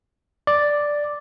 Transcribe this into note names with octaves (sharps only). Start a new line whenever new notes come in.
D5